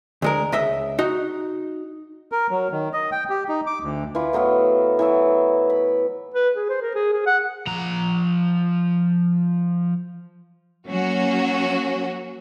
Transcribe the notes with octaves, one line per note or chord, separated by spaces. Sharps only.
D2 G#3 A#4
C#2 D#5 E5
D#4 F#4
A#4
F#3
D#3
D#5
G5
G4
D#4
D6
D2
E3 F4 B5
A2 F#3 B3 F5
E3 F#3 E5
B5
B4
G#4
C5
A#4
G#4
G#4
F#5
F3 A#5
F#3 A#3 C#4 F#4